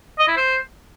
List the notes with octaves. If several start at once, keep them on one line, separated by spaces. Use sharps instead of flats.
D#5
E4
C5